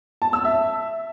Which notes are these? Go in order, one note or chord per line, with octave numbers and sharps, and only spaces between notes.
A5
E6
E5